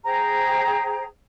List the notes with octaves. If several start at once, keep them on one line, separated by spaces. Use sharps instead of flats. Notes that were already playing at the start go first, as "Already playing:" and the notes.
G#4 C5 G5 A#5